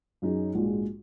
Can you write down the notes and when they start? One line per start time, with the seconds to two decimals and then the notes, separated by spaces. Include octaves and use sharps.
0.22 F#2 F#3 D#4 G#4
0.55 A#1 G#2 G#3 F#4